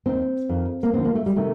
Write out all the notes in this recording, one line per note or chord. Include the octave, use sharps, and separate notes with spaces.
D#2 D#3 C4
F2 D#3
A#3
D#2 D3 F3 C4
A#3
A3
G3
C3 D#3 A3